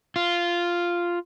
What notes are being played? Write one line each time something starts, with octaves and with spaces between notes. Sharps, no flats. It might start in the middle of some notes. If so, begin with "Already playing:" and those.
F4